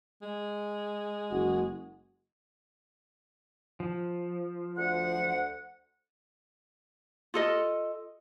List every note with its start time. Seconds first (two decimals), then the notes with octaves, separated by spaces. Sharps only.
0.22 G#3
1.31 F#1 F#4
3.80 F3
4.77 D2 C5 F#5
7.34 F4 A4 D#5